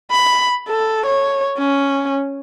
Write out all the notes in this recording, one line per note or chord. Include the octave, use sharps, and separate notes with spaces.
B5
A4
C#5
C#4